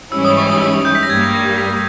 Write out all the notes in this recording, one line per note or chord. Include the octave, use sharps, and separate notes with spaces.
G#2 E3 G3 C#4 E4 E6
D#6
C#6
D#6
E6
G6
B6
A#6
G2 G3 A#3 G#6
B6
A#6
B6
A#6